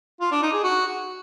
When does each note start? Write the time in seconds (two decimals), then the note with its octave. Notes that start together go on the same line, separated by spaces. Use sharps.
0.21 F4
0.32 D4
0.42 D#4
0.53 G#4
0.64 F#4